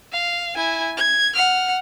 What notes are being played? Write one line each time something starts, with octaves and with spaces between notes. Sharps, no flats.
F5
E4 G#5
G#6
F#5 F6